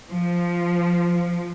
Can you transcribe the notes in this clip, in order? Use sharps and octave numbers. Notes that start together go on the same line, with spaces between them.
F3